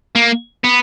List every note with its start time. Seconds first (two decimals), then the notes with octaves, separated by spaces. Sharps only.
0.15 A#3
0.64 B3